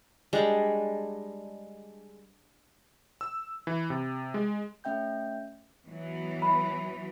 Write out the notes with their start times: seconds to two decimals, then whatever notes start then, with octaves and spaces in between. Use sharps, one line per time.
0.33 G3 G#3 D4
3.21 E6
3.67 E3
3.90 C3
4.34 G#3
4.84 A3 C#4 E5 G5 G6
5.89 E3 F#3 B3
6.42 B5